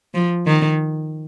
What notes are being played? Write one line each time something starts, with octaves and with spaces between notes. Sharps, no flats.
F3
D#3